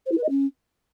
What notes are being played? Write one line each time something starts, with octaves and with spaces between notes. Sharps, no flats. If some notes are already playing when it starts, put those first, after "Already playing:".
C5
E4
B4
D#5
C#4